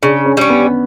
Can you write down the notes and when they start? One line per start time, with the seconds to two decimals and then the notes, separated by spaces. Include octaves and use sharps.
0.03 C#3 D4
0.26 C#4
0.37 G3 C#4
0.50 B3